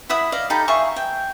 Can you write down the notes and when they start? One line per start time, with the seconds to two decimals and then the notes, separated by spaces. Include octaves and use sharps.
0.09 E4 E5 F#5 D#6
0.32 D5 D#5 F5
0.50 D#4 G4 A4 B5
0.68 F4 G#4 E5 C#6
0.96 G5